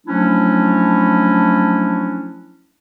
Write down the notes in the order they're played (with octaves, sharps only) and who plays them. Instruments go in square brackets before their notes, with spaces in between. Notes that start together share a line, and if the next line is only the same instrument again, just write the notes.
[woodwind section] F3 F#3 A3 C#4 D4 E4